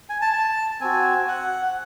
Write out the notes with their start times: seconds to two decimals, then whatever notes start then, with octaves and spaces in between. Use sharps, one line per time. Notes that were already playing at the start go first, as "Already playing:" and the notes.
0.10 G#5
0.21 A5
0.33 A5
0.81 C4 F#4 G#5
1.28 F#5